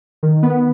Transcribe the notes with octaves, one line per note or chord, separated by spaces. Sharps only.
D#3
B3